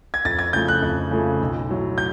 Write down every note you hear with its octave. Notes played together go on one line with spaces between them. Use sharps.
G#6
F2 A6
G#6
C#3 F3 A3 G6
F#6
F2
C#3 F3 A3
B1
A2 F#3
G6